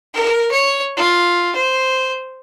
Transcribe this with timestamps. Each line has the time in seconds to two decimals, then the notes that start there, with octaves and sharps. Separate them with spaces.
0.14 A#4
0.51 C#5
0.97 F4
1.55 C5